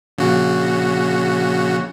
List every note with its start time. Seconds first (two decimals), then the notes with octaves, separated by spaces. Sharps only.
0.18 A#1 C#3 F#4